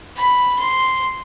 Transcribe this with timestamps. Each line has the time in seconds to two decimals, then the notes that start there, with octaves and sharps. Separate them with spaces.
0.17 B5
0.59 C6